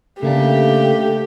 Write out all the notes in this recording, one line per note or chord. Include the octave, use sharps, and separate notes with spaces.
C#3 A3 A#3 D4 G4